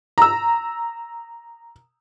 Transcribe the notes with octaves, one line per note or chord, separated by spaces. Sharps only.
A#5 E6